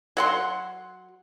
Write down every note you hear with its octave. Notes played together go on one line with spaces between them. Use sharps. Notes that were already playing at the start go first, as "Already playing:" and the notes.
F#3 F#5 C6